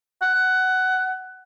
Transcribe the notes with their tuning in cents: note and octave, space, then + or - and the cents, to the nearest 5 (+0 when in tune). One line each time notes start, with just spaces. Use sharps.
F#5 +15